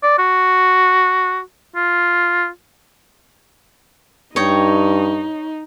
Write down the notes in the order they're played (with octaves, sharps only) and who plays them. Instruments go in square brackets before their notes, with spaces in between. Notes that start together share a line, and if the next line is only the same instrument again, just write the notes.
[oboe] D5
F#4
F4
[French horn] G2 [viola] D#4 [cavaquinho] C#5 D#5 G5